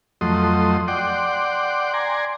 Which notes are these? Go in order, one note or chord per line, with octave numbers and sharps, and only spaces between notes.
F2 F#3 A3 D#5 C6
D5 F#5 G5 C6 D6
D5 G#5 A#5 C6